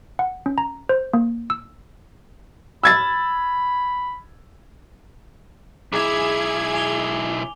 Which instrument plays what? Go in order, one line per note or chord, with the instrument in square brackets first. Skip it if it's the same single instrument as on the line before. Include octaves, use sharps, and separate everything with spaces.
[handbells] F#5
C#4
A#5
C5
A#3
E6
[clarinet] B5 [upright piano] E6 G#6 A6
[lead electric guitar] B1 E4 [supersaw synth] G#4 G#6 [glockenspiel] D6 F7
[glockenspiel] G#5 F7 G7